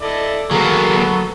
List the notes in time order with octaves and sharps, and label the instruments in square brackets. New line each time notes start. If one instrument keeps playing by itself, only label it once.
[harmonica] E4 D5 D#5 [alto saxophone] A4
[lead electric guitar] D2 A#3 [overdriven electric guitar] F#3 [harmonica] B3 A4 [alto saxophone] G#4